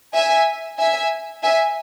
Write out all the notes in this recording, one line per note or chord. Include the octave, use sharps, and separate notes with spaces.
E5 G#5
E5 G#5
E5 G#5